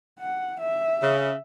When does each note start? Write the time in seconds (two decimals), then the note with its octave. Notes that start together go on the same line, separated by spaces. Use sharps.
0.19 F#5
0.60 E5
1.03 C#3